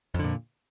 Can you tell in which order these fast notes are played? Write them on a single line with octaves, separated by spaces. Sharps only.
F2 D3 A#2